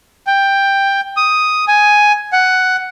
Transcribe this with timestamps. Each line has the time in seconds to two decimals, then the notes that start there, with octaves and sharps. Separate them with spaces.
0.27 G5
1.17 D#6
1.68 G#5
2.33 F#5